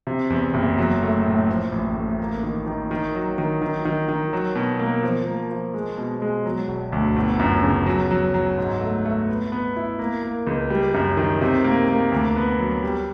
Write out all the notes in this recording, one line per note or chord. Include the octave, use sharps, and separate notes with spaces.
C3
E2
F#1
F#3
A3
A2
F3
A1
A3
A#3
D#3
D#3
D#3
F#3
D#3
D#3
D#3
D#3
F#3
B2
A#3
F3
A#3
F3
G#3
B2
G#3
F#3
E1
D2
G1
F#2
C#3
F#3
F#3
F#3
G#2
A3
A3
B3
B3
E4
A#3
A#3
C#2
G3
F#2
D#3
C3
A#3
A#3
D2
B3
F#3
G3